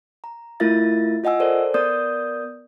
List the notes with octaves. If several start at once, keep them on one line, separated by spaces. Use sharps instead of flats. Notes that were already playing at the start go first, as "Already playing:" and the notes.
A#5
A3 E4 F4 A#4 E5 A6
F4 D#5 F#5 G#5 E6
A4 A#4 C5 D5
B3 A#4 D5 D#6 G6